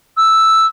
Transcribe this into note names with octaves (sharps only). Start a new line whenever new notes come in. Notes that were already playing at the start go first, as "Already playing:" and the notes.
E6